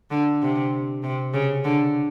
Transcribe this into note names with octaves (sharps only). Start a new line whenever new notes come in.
D3
C3
C3
C#3
D3